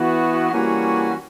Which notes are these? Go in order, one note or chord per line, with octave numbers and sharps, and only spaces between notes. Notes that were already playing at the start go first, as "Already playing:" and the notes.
Already playing: E3 B3 F#4
E3 G3 A#3 C#4 F#4